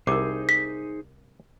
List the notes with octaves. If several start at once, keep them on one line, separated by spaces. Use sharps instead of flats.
C2 D#4 G#4 A#4 C5 D6
B6